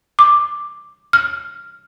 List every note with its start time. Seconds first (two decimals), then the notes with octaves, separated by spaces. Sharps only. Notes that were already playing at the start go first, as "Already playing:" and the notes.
0.19 D6
1.13 F6